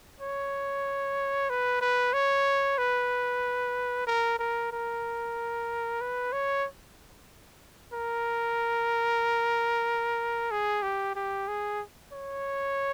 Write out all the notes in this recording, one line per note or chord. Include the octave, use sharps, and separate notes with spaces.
C#5
B4
B4
C#5
B4
A#4
A#4
A#4
B4
C#5
A#4
G#4
G4
G4
G#4
C#5